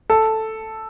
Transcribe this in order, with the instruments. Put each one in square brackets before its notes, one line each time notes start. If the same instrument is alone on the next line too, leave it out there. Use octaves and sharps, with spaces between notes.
[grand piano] A4